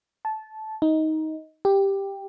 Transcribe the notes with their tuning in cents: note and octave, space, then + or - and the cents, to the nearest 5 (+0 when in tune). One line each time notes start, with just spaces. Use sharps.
A5 -15
D#4 +15
G4 +5